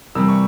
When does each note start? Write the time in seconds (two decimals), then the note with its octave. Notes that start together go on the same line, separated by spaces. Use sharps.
0.15 C3 E3 G3 A#3 E6
0.28 C#6